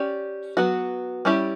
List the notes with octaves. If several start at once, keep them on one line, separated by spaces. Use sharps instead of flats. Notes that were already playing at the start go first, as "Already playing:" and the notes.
Already playing: C#4 G4 D5
F#3 B3 F#4
G3 C#4 E4 G4